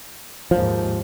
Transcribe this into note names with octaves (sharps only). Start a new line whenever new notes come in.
D#2 G#2 F3